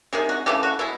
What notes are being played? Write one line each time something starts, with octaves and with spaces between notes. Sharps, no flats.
C3 D#3 G#3 G#4
F#4
C#3 E3 A3 G4
F#4
B2 G#3 E4